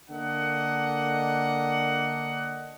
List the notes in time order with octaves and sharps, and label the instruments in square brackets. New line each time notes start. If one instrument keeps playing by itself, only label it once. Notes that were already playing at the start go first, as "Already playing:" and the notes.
[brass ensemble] D3 A#3 D4 D#5 F#5